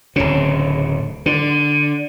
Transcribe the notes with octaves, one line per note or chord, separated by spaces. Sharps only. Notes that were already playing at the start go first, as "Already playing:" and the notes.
D1 C#3
D3